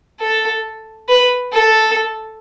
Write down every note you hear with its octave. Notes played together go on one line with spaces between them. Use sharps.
A4
B4
A4